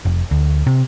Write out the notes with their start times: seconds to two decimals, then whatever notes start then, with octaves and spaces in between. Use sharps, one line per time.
0.05 F1
0.31 D2
0.67 C3